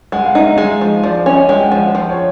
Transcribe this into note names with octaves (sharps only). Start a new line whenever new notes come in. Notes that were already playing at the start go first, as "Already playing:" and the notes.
G#3 F#5
F5
D#4 E5
G#3 F5
F3
F3 D5
C#4
D#5
G#3 G5
F#5
F3
F5
F3
C#5